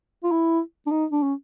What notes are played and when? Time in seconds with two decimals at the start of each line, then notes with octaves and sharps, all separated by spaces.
0.24 F4
0.32 E4
0.86 D4
0.91 D#4
1.12 D4
1.23 C#4